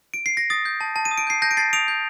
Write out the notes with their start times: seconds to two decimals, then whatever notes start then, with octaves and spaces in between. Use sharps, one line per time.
0.14 D7
0.26 C7
0.37 A#6
0.50 D#6 A6
0.66 G6
0.81 A5
0.96 A5
1.05 D#7
1.11 D#6
1.18 D7
1.27 G6 C7
1.42 A5 G6 A#6
1.51 D7
1.57 A5 A6 C7
1.73 D#6 D7 F7
1.88 G6